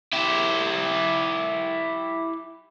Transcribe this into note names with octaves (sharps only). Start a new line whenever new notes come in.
E4 G4